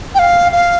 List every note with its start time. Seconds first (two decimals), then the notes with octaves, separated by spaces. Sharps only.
0.15 G5
0.19 F5
0.52 F5